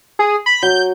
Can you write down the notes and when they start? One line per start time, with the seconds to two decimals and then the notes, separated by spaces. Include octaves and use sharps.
0.19 G#4
0.46 B5
0.63 F#3 G6